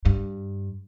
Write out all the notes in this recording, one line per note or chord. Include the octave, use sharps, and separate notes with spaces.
G2